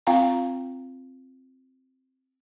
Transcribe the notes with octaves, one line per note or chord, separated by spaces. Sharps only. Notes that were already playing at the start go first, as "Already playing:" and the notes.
C4 F4 F5 G5 A#5